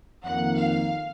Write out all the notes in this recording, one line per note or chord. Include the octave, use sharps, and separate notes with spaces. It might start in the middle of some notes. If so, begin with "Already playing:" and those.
F2 D#3 A#3 F#5
F5